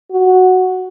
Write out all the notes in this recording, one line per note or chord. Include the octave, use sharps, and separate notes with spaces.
F#4